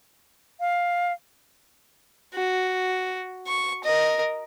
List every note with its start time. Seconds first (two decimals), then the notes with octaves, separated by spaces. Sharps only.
0.60 F5
2.35 F#4
3.47 C#6
3.84 A#4 D#5